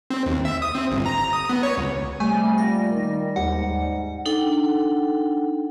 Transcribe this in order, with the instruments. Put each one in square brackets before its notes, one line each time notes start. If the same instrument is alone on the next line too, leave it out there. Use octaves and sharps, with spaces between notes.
[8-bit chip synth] C4
D#2
E5
D#6
C4
G1
A#5
D#6
B3
C#5
C#2
[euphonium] C3 [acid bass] G3 [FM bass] A3 [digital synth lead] G#5
[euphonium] A#2 [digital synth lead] A#6
[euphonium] D#3
[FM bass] D#2 [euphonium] G#2 [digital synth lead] F#5
[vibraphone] D4 D#4 A4 F#5 G5